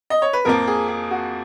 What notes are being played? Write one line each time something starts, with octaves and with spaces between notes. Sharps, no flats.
D#5
C#5
B4
F2 F3 A#3 A#4
G#4
G#4
F#4